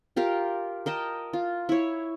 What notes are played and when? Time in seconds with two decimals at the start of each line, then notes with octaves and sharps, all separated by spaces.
0.16 F4 G4 A#4 F5
0.86 A#4 D#5 G5 A5
1.33 F4
1.69 E4 C#5